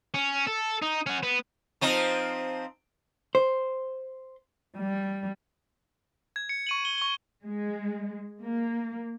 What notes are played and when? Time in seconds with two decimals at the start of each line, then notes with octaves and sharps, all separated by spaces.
0.14 C#4
0.47 A4
0.82 D#4
1.07 C#4 F#4
1.23 B3
1.81 F3 C4 D#4
3.35 C5
4.77 G3
6.36 G#6
6.49 C#7
6.67 C#6 D#7 F#7
6.85 G7
6.98 C#6 G7
7.44 G#3
8.42 A#3